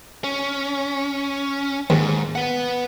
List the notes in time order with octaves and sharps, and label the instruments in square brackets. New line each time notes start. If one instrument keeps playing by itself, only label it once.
[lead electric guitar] C#4
[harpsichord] D#2 [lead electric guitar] G#2
[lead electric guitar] B4 F#5